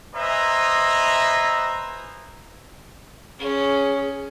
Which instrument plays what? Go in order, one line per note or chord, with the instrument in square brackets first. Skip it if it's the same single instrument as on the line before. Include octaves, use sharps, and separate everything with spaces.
[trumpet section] B4 C5 D#5 E5 G#5 A#5
[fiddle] C#4 [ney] G#4